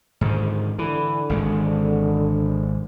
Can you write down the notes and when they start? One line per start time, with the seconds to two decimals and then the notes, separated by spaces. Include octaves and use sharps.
0.21 G#2 D3 D#3
0.79 D3 E3
1.30 G#1 C#3 G#3